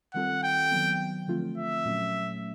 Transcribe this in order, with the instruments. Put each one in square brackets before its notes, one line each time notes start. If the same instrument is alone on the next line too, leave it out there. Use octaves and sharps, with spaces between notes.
[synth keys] D#3 G3 C4 F4 A4 [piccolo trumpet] F#5
[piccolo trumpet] G5
[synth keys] D#3 F#3 B3
D3 F3 A3 C4 F4
[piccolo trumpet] E5
[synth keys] A#2 F#3 A3 C#4